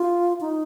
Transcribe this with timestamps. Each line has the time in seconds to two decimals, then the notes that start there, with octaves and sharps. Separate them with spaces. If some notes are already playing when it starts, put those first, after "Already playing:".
Already playing: F4
0.41 D#4